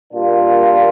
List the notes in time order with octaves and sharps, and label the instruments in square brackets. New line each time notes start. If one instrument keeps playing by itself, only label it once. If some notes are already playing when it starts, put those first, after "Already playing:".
[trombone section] A#2 G3 A#3 D4 F4